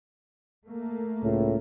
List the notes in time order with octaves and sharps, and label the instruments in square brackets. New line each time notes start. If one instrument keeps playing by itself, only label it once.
[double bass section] A3 A#3
[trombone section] C#2 A2